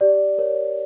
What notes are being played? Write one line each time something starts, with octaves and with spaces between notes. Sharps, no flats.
G4 D5
A#4 C#5